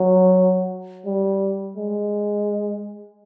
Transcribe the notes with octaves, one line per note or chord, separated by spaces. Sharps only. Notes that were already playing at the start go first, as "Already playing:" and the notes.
Already playing: F#3
G3
G#3